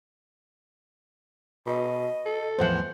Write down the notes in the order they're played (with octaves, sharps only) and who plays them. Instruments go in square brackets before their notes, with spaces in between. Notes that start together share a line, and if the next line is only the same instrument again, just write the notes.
[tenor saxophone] B2 [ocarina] D#5
[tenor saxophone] A4
[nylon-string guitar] E2 A2 F3 [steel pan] C5 F#5